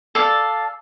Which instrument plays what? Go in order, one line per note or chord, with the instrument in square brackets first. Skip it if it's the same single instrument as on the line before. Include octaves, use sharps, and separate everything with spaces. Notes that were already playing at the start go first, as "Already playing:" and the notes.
[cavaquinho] A4 D5 F5